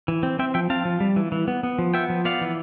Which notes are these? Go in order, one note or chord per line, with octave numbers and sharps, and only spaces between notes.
E3
C4
C4 E5 G5
F3 E5 G5
C4 F5 A5
F3
G3
E3
E3
B3
B3
F3
B3 E5 G5
F3
B3 D5 F5
E3